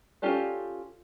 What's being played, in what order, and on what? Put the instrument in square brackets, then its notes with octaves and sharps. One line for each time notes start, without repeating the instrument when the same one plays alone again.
[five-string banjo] C#4 F4 G4 A4 D5